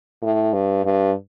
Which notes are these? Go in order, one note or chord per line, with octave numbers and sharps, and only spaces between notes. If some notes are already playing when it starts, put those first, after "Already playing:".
A2
G2
G2